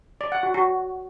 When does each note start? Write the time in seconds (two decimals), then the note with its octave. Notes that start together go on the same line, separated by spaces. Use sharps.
0.21 D5
0.32 F#5
0.43 F#4
0.54 F#4